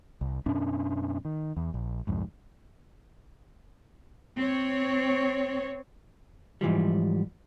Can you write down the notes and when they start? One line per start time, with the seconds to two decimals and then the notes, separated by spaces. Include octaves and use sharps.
0.21 C2
0.46 F#2 B2 C#4 D4
1.25 D#3
1.57 E2
1.74 A#1
2.07 C2 F2 G#2
4.36 C4 C#5
6.61 G#2 E3 F3 G3